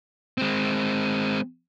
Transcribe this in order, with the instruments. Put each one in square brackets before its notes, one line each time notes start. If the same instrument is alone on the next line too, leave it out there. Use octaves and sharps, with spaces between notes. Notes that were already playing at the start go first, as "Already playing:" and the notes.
[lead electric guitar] G#3 C4